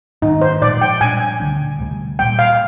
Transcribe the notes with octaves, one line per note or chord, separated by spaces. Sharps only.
G#2 D#3 A#3 D#4
C5
A#2 F3 G#3 D5
G5
A#2 G3 D4 G#5
D2 D3 G3 D4
D2 C3 G3
A#2 G3 A#3 G5
F5